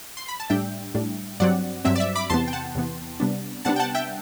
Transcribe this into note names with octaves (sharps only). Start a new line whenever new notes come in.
C6
B5
A5
A2 G3 D4 E5 G5
A2 G3 D4
G2 F#3 C4 D5 F#5
G2 F#3 C4 E5
D5
E5
B5 D6
E2 C3 E3 B3 A5 C6
G5
F#5 A5
E2 C3 E3 B3
C3 G3 B3 D4
C3 G3 B3 D4 F#5 A5
G5
F#5 A5
E5 G5